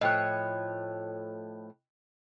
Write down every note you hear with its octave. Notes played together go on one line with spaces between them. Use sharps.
A2 F3 C#5 D#5 G5 F#6